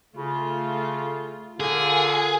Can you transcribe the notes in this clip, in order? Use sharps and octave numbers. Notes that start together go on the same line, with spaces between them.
C#3 A3 F4
D3 F4 G#4 A#4